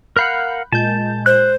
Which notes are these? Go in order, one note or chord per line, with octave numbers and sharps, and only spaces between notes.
A#4 F5 F#5 B5 F#6 G6
A#2 G#3 A5 G6
C5 F#6